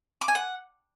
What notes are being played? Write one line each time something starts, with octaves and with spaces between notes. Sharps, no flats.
D6
G#5
F#5